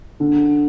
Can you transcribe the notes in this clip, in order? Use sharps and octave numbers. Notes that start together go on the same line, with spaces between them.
D3